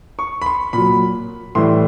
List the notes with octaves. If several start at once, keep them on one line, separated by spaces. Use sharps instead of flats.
C#6
B5
C6
A#2 F#3 B5
A2 E3 G3 C6